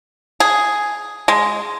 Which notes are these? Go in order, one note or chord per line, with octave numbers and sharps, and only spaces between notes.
G#4
G#3